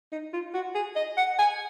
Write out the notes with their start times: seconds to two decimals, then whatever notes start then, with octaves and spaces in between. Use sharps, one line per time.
0.12 D#4
0.33 F4
0.54 F#4
0.75 G#4
0.96 D#5
1.17 F#5
1.39 G#5